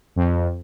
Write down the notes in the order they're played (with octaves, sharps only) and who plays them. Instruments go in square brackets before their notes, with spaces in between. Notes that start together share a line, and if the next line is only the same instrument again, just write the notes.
[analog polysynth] F2